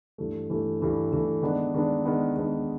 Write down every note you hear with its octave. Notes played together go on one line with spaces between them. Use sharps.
G2 E3 A3
G2 E3 A3
G2 E3 A3
G2 E3 A3
D#3 G#3 B3 D4
D#3 G#3 B3 D4
D#3 G#3 B3 D4
D#3 G#3 B3 D4